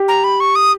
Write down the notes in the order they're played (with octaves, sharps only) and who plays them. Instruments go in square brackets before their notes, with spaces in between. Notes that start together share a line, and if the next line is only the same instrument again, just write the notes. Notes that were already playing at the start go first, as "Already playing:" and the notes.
Already playing: [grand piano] G4
[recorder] A#5
B5
C#6
D#6